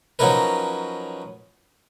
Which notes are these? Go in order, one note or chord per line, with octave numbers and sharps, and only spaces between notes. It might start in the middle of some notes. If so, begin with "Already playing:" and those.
F3 F#3 C#4 D#4 A#4 B4